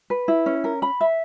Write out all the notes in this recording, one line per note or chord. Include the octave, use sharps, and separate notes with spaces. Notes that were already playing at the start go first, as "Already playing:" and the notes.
B4
E4
C#4
A#4
B5
E5